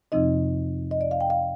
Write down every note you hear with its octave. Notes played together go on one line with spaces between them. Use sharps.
F2 C3 F3 C4 D#4 D#5
D#5
D5
F5
G5
F5